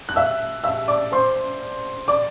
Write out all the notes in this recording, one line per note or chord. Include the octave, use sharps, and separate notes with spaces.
F#6
E5 E6
E5 E6
D5 D6
C5 C6
D5 D6